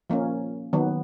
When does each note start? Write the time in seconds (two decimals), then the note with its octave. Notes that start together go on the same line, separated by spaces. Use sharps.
0.10 F3 A#3 C#4
0.73 D#3 F#3 B3